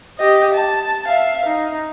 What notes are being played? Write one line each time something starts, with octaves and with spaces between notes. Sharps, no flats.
G4 D#5
A5
E5 F5
D#4